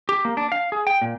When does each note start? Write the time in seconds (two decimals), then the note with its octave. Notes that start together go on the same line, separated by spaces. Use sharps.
0.09 G4
0.25 A#3
0.37 D4
0.52 F5
0.72 G#4
0.87 G5
1.02 A#2